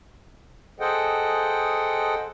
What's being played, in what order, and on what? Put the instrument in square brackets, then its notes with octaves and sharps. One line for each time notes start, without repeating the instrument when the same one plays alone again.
[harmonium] G#4 A4 C5 D#5 F#5 G5